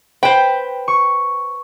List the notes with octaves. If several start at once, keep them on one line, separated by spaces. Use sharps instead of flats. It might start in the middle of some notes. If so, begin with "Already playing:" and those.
B4 C5 G5
C#6